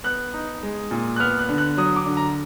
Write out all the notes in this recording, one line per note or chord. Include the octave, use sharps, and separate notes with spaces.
B3 F#6
D#4
G#3
A#2
F#6
B3 F6
F#6
D3
F#6
F#3 D#6
D6
D3
A#5